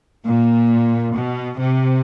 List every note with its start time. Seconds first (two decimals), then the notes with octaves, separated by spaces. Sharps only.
0.24 A#2
1.14 B2
1.58 C3